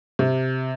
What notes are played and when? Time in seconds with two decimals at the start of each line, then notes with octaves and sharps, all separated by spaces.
0.19 C3